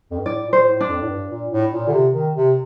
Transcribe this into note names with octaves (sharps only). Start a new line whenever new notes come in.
F2
G2
A2 D5
A#2
C5
A2
D4
F2
A2
G2
A#2
A2
A#2
D3
C3
D#3
C3